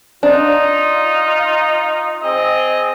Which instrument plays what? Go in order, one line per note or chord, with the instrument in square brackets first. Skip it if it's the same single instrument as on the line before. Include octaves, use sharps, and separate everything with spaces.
[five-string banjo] D4 [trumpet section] D#4 F4
[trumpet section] C4 G#4 D#5